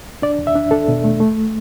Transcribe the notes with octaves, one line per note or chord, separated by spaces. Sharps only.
D4 D5
E2
E5
D4
D4 A4
B2
A3
A3